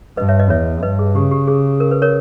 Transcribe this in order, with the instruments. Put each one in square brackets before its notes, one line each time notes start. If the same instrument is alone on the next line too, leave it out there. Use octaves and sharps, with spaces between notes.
[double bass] G2 [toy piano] B4 D#5
[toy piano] C#5 E5
B4 D#5
[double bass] E2 [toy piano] C#5 E5
[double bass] G2 [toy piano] B4 D#5
[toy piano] G#4
[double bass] C#3 [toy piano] G4
[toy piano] G4
G#4
A#4
B4
A#4 C#5